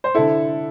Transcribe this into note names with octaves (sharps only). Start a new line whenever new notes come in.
C5
D3 E4 A4